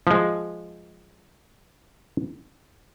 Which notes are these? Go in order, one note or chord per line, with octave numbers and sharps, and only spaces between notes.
F3 G#3